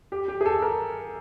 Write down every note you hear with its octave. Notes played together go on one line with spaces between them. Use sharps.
G4
G4
G#4
A4
A#4